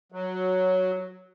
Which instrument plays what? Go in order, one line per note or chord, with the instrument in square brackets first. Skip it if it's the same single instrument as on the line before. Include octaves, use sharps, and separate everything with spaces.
[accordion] F#3